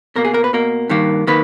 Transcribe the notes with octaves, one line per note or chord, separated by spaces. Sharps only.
B2 A#3 A#4
G#4
A#4
B4
B2 A#3 A#4
G2 D#3 A#3
D#3 A#3 B4